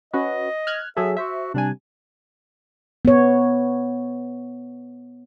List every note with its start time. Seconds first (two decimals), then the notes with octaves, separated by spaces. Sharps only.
0.13 C#4 F#4 B4 D#5
0.67 F6 F#6 G#6
0.97 F#3 G#4 A4 E5
1.17 F#4 C5 E5
1.54 C3 G3 D4 G#5
3.05 B3 C#5